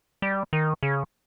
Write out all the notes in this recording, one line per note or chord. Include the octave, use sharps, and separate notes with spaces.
G3
D#3
C#3